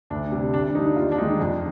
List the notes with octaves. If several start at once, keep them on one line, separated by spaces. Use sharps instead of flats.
D2 D4
C3 G3
D2 D4
D3 G3 D#4
D#2 F4
D4
D#3 G#3 D#4
F2